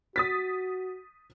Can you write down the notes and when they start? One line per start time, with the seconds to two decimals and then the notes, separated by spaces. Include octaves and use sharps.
0.16 F#4 D#6 A6 B6